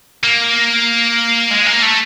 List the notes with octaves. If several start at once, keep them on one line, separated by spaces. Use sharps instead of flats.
A#3
G#3
A#3
A3